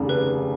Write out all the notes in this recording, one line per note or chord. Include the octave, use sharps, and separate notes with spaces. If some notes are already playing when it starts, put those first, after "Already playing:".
Already playing: F1 D#2 C#3
B4